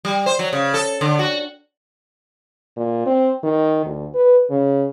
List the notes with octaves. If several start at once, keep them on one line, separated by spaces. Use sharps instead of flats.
G3
C5
F#3
C#3
A4
D3
F#4
A#2
C4
D#3
D2
B4
C#3